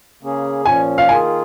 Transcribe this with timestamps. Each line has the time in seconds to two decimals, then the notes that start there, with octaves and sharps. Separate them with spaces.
0.22 C#3 A#3 C#4 G#4
0.65 A#2 F3 C#4 G#5
0.98 F5
1.09 D#3 A#3 F4 G#4 G#5